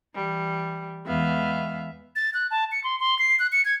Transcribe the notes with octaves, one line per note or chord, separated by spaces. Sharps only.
E3 G3
E2 E3 G#3 B3 E5 F5
A6
F#6
A5
C#7
C6
C6
C7
F#6
C#7
G#6